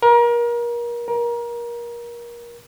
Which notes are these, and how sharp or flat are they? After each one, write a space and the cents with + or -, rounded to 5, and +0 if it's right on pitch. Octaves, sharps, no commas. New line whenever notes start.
A#4 +30
A#4 +25